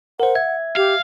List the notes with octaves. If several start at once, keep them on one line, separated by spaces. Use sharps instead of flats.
A#4 C5 F#5
E5 G#6
G4 F5